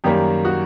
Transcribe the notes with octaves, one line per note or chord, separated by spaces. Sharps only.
F#2 D#3 G3 A#3 G4
F#4